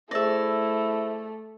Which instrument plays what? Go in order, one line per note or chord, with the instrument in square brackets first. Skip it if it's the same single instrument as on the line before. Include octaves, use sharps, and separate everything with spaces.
[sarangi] A3 [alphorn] E4 [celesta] G#4 C5 A#6 [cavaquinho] D5 E5